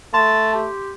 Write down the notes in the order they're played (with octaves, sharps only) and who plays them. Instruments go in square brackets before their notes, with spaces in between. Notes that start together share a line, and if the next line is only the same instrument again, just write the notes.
[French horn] A3 [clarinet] A5 [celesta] C6
[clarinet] G4